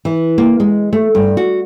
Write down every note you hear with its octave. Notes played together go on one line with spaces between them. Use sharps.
E3
A#3
G#3
A3
G2
F#4